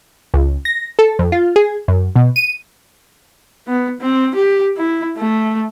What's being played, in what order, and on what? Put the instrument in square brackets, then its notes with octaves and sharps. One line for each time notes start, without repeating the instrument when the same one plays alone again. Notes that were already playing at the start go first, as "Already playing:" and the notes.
[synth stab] C#2
A#6
A4
F2
F4
G#4
F#2
B2
D#7
[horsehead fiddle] B3
C4
G4
E4
A3